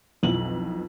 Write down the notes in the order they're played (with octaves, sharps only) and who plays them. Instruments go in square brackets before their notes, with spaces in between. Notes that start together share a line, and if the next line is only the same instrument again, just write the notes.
[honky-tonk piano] B1 F2 E3 F3 F#7